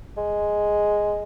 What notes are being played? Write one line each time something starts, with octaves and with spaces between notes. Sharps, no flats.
G#3